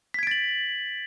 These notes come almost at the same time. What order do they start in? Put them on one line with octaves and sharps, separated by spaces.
B6 G#6 D7 A6 F#7